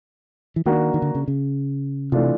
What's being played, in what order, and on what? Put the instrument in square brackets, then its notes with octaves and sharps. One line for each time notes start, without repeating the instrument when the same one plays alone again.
[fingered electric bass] E3
[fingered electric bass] D#3 [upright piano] A#3 D4 F#4
[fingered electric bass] D#3
D3
C#3
C#3
[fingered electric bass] C3 [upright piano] E3 A3 D4 F4